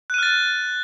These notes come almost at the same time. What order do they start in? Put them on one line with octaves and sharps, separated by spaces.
F#6 D#7 F6 A6